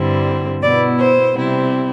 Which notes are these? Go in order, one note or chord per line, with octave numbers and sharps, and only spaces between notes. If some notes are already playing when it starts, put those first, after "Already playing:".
Already playing: G2 D3 G3 C4 E4
B2 B3 E4 D5
C5
C3 G3 C4 E4